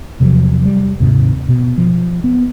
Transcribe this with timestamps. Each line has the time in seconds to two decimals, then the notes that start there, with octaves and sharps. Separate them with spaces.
0.20 E2 C3 F3 F#3
0.65 G3
1.00 D#2 G#2 C3
1.48 B2
1.78 F3
2.24 B3